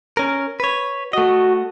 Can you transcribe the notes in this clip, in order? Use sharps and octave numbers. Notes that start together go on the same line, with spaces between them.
C#4 A#4
B4 C#5
A3 F#4 D#5